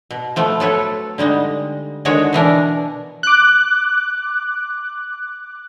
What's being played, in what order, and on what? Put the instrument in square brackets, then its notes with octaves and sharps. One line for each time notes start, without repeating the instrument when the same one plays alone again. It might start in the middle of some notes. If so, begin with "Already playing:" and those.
[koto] B2
F3 A3 B3
F#3 A4 B4 C#5
D3 G3 G#3 D#4
D3 D#3 G#3 F#4 C#5
B2 E3 D4 A#4
[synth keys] D6 F#6